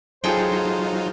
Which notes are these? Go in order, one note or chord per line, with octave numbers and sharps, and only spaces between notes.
F#3 D#4 F4 G#4 A4 C5 G5